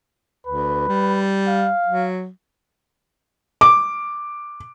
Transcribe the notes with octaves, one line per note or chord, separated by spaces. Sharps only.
D2 B4
G3
F5
F#3
D6